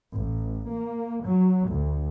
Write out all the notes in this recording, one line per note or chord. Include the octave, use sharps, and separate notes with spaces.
A1
A#3
F#3
D2